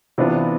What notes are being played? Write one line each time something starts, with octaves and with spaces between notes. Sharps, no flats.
C3 E3 B3 D4 F4